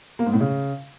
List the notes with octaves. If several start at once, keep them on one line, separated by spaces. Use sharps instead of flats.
A#3
G#2
A2
C#3